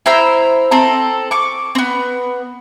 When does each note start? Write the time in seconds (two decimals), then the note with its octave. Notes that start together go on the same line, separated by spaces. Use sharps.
0.06 E4 C5 A#5 E6
0.71 C4 A4 A#5
1.31 C#6 D6
1.75 B3 C4